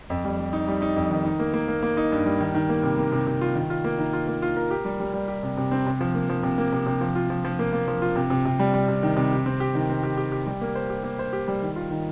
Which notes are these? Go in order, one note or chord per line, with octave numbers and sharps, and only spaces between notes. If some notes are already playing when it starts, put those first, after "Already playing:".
F2
G3
G3
D#4
G3
D#4
F2
D#3
D#4
A#3
A#3
A#3
A#3
D#4
G2
G3
D#3
D#3
A#3
C3
A#3
C3
C3
F4
D#3
F4
A#3
D#3
F4
A#3
F4
A#4
G4
G3
G3
G3
G4
C3
C3
C4
C3
F3
A#3
F3
C3
A#3
C3
C3
F3
F4
F3
F3
A#3
A#3
F3
F4
C3
C3
C3
G3
G3
C3
D#3
C3
G4
C4
G4
D#3
C4
G4
G4
G4
G3
A#3
C5
G4
A#3
C5
G4
G3
D#3
F4
D#3